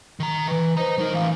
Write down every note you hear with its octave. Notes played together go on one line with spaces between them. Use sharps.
D#3 A#5
D#3 E3 B4
C5 D#5 A#5
F#3 D#4 A#4
A2 E3 F5